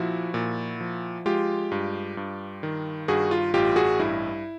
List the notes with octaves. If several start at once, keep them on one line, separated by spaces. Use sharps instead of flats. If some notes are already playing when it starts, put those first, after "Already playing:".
Already playing: A#2 F3 E4 F#4
A#2
F3
G#3 F4 G4
G2
G2
D#3
G2 F#4 G#4
F4
A1 F4 G4
F#4 G#4
G2 E4